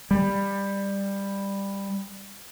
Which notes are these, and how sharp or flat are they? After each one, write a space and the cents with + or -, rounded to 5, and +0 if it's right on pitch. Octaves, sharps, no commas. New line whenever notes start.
G3 +15